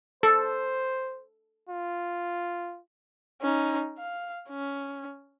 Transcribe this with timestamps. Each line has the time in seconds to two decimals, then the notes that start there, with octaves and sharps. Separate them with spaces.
0.23 A4 C5
1.69 F4
3.42 C#4 D#4
3.99 F5
4.50 C#4